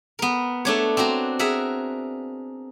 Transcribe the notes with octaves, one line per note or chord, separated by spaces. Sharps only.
B3 A#4
A3 D4 C#5
C4 D4 F#4 A#5
G#4 A#4 E5 F#5